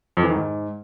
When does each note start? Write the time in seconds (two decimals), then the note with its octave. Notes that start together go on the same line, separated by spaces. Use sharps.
0.17 F2
0.23 E3
0.29 D#3
0.35 G#2